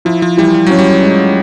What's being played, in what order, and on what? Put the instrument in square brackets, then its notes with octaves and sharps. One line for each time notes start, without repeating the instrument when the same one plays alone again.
[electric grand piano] F3 [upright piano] E4
[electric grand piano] F3
[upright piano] E3 [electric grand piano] G3
[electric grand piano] G3
[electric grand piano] F#3 [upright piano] C#4
[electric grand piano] G3
[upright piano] G#3